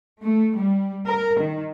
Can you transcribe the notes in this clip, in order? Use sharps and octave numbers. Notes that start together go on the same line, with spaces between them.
A3
G3
A#4
D#3